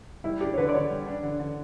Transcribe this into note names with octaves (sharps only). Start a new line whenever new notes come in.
G3 E4
D4 G4
C#5
D3 B4
D5
D3 C#5
G3
D4
D3
D3